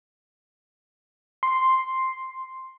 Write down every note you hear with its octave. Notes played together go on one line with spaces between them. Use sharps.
C6